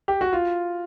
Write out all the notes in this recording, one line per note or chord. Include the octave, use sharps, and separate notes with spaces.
G4
F#4
F4